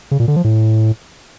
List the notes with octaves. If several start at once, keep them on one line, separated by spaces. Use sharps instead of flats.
C#3
A#2
D3
F3
A2